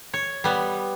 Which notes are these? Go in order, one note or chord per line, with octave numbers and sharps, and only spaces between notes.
C#5
G3 B3